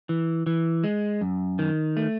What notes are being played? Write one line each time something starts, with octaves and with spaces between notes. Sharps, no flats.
E3
E3
G#3
F#2
D#3
A3